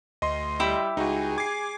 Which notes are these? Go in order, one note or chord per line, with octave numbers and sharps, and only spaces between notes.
D2 D#5 C6
G3 E4 G4 E5
C#2 D#4 F#4 G#4
D6 G#6 C7